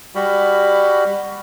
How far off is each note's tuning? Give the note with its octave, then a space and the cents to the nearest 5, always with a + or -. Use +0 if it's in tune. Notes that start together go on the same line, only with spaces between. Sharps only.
G3 +25 F#4 +15 B5 +0